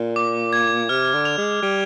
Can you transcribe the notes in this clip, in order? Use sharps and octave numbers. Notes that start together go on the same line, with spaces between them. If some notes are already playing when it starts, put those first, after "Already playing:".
Already playing: A#2
D6
G#6
C3 F6
D3
F7
G#3
G3 F6